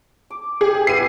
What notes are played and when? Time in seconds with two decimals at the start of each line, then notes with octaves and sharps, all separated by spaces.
0.30 D6
0.61 G4 G#4
0.87 B3 E4 C7 D#7